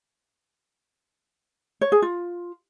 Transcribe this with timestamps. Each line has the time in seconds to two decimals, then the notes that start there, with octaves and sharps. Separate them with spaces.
1.81 C#5
1.92 G#4
2.02 F4